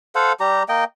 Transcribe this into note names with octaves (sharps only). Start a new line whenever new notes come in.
A4 C5 F5 F#5
G3 G4 A#5
A#3 D#5 G5